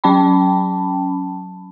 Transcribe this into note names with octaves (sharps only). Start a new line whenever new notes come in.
F#3 C#4 G5 A5 B5